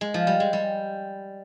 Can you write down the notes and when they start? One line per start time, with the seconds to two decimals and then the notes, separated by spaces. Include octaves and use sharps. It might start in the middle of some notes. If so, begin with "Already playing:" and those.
0.01 G#3
0.14 F3
0.27 G3
0.40 G#3
0.53 G3